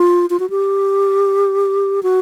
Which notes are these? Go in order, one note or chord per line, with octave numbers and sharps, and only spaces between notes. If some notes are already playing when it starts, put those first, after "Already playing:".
Already playing: F4
F4
F#4
G4
F#4